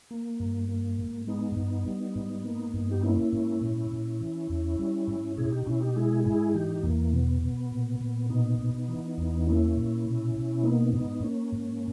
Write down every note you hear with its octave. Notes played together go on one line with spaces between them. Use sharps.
A#3
G2
A#3
G#2
G#3 B3 D#4
G2
G3
G#2
A#3
G2
G4
A#3 C#4 E4
G#2
A#2
A#2
E3
E2
G3
G#2
B2 E4 G#4
D#4 G4
B2 C#4 E4
D#4 G4
G#3 E4 G#4
G#2 E4 G#4
E3 D#4 G4
E2 A#3
B2 B3
B2
A#2
A#2
B2 B3 D#4
B2
E3
E2
A#3 C#4 E4
A#2
B2
B2
A#3 B3 D#4
G#2 B3 D#4
A#3 C#4
G#2